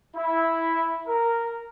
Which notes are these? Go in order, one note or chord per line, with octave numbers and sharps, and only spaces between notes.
E4
A#4